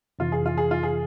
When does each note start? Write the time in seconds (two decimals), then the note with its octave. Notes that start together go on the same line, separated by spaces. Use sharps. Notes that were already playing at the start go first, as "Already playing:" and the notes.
0.19 F2 C3 E3 F4
0.32 G#4
0.46 F4
0.58 G#4
0.71 F4
0.83 G#4